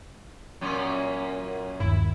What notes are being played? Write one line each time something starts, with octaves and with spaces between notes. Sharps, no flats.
F#2 A#2 C#4
G1 D#2 E4